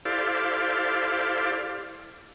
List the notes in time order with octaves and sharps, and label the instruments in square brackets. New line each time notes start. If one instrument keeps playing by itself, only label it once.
[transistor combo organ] E4 G4 A4 C5 D5 F5